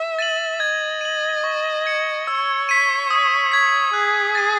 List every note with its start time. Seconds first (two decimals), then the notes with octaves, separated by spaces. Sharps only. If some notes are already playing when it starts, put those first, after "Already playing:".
Already playing: E5
0.19 A6 D#7 F#7
0.59 D#5 G#6
1.01 D#7 F#7
1.44 C#6
1.86 G#6 C#7
2.27 C#5 E6
2.69 B6 D#7
3.10 D#6
3.52 G#6 B6
3.93 G#4 F#6
4.35 A6 D#7